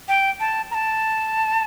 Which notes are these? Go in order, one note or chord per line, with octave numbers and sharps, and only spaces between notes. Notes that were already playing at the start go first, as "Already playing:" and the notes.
G5
A5
A#5
A5